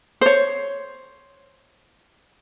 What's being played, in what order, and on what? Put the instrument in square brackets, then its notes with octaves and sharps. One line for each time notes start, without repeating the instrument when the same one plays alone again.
[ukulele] C5 C#5